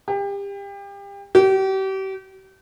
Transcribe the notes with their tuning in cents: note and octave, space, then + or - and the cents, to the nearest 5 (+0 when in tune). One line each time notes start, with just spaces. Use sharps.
G4 +30
G4 -35